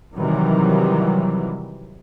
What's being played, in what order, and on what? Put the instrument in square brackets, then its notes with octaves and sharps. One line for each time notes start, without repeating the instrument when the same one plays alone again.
[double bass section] C3 D#3 E3 F#3 G3